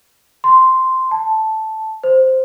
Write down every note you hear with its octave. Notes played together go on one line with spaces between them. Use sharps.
C6
A5
C5